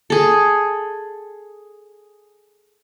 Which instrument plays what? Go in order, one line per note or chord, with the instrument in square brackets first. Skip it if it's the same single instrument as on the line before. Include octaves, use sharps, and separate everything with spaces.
[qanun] G#4 A4